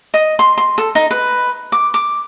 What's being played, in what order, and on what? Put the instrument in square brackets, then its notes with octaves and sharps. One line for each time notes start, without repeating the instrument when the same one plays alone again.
[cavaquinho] D#5
C6
C6
A4
D#4
B4
D6
D6